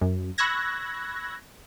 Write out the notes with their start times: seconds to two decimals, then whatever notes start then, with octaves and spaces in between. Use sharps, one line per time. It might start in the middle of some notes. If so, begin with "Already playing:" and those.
0.01 F#2
0.38 B5 C#6 E6 F#6 G#6 A#6